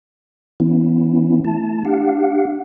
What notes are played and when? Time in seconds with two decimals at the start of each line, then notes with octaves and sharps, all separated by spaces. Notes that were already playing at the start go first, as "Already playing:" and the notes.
0.60 E3 B3 C#4 E4
1.45 A3 E4 A5
1.85 D4 G4 F5 F#5